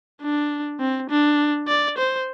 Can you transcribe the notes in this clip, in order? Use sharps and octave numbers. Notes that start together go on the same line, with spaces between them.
D4
C4
D4
D5
C5